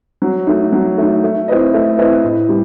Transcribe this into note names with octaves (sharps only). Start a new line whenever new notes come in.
F#3
A3 D#4
F#3
A3 D#4
A3
C4 E4 B4 D#5
A3
C4 E4 B4 D#5
A2
G3